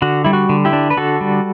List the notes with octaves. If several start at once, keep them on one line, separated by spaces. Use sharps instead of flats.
D3 F#4
G3 E4
F#4
D3
E4 G4
D4
B4
D3 F#4 A4
G3